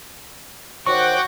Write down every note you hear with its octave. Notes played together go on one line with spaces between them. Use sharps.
D#3 F#4 C5 C#5 F#5 G5 C#6 D6